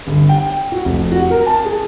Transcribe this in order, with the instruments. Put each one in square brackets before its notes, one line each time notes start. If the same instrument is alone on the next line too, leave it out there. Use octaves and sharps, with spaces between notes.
[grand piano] G1
G5
G5
F#4
F1
F#4
A#4
A5
G#4